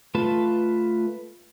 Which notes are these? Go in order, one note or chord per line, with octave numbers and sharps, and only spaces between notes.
A3 F4 B4 A5